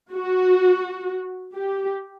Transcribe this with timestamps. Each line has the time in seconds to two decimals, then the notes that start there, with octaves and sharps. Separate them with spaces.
0.12 F#4
1.54 G4